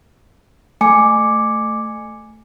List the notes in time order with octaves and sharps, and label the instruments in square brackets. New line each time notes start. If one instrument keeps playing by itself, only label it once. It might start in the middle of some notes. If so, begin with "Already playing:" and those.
[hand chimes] A3 G#5 D6 C#7